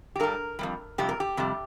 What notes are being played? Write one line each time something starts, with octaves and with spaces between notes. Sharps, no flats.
G4
G2 G3 A#4
F2 C3 G3
F2 C3 G3 G4
A#4
G4
F2 C3 G3